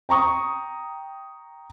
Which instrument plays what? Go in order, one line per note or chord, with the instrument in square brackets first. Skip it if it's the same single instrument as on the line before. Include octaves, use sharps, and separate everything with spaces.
[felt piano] G5 A#5 C#6 D#6